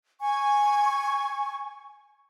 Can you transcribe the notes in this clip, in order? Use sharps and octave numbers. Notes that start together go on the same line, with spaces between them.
G#5 C#6